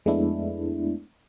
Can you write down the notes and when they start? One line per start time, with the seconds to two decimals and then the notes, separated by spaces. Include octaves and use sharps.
0.06 F2 G#3 A3 B3 D4 E4